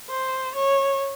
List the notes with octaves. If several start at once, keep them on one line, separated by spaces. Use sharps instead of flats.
C5
C#5